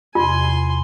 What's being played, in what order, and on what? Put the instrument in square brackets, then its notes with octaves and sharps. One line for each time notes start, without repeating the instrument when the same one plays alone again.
[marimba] E2 C3 [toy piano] F4 [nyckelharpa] G#5 C6